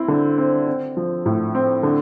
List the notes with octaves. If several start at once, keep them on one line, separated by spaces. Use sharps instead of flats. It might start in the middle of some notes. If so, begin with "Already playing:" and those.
Already playing: C4 E4
D3
C4
C4
F3
A2
C4
D3